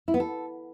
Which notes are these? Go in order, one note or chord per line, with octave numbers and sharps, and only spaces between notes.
E4
B3
A4